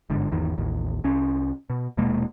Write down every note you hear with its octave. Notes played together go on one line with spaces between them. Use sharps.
G1 G#2 D3
G#1 E2 D#3
A1 D#2
C2 C#4
B2
D#1 B2 G#3 A#3